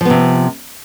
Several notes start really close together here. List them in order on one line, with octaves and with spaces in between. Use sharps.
F3 B3 C3